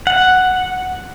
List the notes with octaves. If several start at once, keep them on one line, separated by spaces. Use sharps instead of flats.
F#5